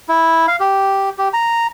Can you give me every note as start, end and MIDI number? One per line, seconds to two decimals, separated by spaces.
0.09 0.46 64
0.48 0.56 77
0.60 1.10 67
1.18 1.29 67
1.33 1.67 82